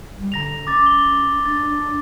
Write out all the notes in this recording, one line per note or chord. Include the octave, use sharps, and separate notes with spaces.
G3
D3 A#5 A#6 F7
C#4 D6 A6
G7
D4 A6